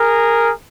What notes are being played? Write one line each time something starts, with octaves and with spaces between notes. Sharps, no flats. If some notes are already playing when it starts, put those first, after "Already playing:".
Already playing: G#4 A#4